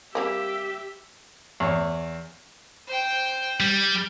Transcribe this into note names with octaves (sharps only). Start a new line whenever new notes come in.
G3 A#3 C4 G4 E5
E2 C#5
C5 G5
G3